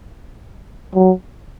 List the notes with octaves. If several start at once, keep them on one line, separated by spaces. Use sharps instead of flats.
F#3